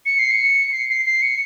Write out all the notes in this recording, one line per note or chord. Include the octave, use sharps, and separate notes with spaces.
C#7
C7
C#7
C7
C7
C7
C#7